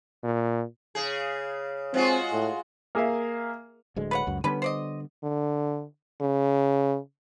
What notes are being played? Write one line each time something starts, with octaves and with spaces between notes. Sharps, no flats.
A#2
C#3 G#4
G#3 C4 F4 F#4
A2
A#3 G#4 A#4 E5 F5
D1 D2 G#3
B4 C#5 F#5
C#2 F#2
D3 G3 B3 C#4 B4
C5 D5 D#5
D3
C#3